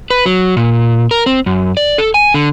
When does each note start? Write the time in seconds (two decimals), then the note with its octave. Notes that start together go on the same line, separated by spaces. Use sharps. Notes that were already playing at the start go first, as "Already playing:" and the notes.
0.10 B4
0.26 F#3
0.57 A#2
1.11 A#4
1.26 C4
1.46 F#2
1.77 D5
1.98 A4
2.14 G#5
2.34 D3